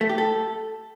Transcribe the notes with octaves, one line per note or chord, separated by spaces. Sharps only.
A3
G4
A4